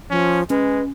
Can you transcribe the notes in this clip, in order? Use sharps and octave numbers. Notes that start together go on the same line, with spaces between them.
F3 C#4
G#3 C#4 B4